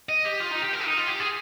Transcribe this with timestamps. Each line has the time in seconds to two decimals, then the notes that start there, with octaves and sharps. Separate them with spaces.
0.09 D#5
0.25 G4
0.40 F4
0.51 D#4
0.62 G4
0.73 A#4
0.85 D#4
0.97 F4
1.08 G4
1.20 G#4